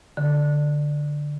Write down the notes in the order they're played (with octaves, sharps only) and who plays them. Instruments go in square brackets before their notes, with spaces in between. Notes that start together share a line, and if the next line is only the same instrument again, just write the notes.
[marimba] D3